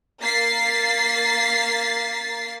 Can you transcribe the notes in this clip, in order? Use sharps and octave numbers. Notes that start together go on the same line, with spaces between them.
A#3 A6 B6 C7